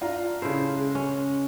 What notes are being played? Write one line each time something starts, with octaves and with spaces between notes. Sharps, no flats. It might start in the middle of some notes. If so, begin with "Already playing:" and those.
D4 F4 A#5
C#3 E4 A4 C5
G#3
C#4